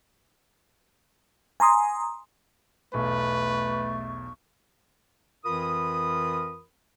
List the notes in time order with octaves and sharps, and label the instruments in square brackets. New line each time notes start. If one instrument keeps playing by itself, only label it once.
[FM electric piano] G#5 A#5 C6 D#6
[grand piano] B1 E2 [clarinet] A3 [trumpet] B4 [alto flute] C#6
[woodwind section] F2 E3 F4 A#4 B5 D#6